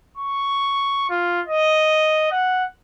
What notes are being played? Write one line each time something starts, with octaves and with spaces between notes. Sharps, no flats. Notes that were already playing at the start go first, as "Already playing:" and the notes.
C#6
F4
D#5
F#5